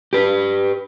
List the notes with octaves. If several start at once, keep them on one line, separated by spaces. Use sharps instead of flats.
G4 B4